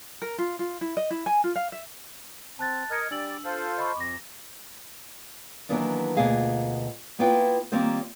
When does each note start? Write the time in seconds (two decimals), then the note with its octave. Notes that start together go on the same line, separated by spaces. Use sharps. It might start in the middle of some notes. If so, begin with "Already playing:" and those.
0.22 A#4
0.38 F4
0.59 F4
0.81 E4
0.97 D#5
1.11 E4
1.26 G#5
1.44 F4
1.56 F5
1.72 E5
2.59 C4 A5 F#6 A6
2.90 A#4 D#5 F6 G#6 C#7
3.11 G3 D4 D5 E6 F#7
3.45 F4 A4 C5
3.78 D#5 B5 C#6
3.96 F2 D6 A#6
5.69 D#3 E3 F#3 A#3 B3 D4
6.17 D2 B2 A#3 F4 G#4 F5
7.19 A#3 B3 E4 F4 B4 G5
7.72 D#3 G3 A#3 C4 F4 C5